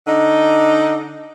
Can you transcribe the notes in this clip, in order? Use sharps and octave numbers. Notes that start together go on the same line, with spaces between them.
D3 D#4